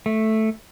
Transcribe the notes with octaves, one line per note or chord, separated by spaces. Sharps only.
A3